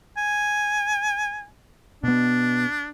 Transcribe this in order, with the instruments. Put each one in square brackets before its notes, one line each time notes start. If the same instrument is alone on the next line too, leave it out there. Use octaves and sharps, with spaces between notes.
[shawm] G#5
[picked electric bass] B2 B3 [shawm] D4